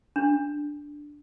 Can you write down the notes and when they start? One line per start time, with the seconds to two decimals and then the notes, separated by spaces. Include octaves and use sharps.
0.16 D4